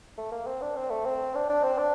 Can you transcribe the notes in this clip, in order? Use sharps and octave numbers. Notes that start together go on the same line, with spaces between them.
A3
A#3
C4
D4
C4
A3
C4
D4
D4
C4
D4